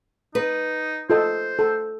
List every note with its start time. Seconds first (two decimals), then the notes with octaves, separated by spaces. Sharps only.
0.35 D#4 B4
1.10 F4 A4 C5 D#5
1.59 A4